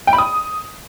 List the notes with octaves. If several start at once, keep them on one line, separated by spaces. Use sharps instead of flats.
G5
B5
D#6